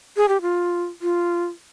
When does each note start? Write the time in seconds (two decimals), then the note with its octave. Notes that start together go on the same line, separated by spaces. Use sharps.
0.17 G#4
0.28 G4
0.42 F4
1.02 F4